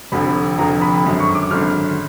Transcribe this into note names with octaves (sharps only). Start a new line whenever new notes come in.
F1 F2 D3 B5
F1 F2 D3 A#5
B5
G#1 F#2 D3
C#6
D6
G#1 F#2 D3 F6